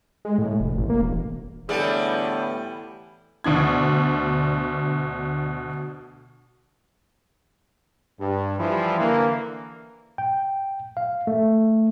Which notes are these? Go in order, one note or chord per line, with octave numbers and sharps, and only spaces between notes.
G#3
A2
F1
A1
A#3
E1
A2 D3 E3 G3 B3 G#4 D5
D2 B2 D4 G#6
G2
E3 F3 G3 E4
D3 E3 A#3
G5
F5
A3